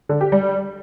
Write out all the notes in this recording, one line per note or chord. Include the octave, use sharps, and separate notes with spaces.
D3
G4
G3